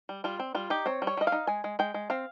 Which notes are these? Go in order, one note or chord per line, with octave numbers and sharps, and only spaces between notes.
G3
G3 F4
C4
G3 F4
D#4 G4
C4 C#5
G3
C#5
G3 D#5
F5
D#4
G#3 G#5
G#3
G#3 G5
G#3
C4 F5